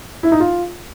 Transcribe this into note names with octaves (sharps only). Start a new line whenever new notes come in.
E4
D#4
F4